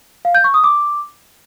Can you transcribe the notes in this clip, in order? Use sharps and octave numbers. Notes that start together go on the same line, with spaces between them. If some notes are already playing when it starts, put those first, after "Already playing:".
F5
G6
C#6
D#6
D6